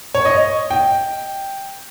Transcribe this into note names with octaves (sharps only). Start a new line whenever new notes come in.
C#5
D#5
G5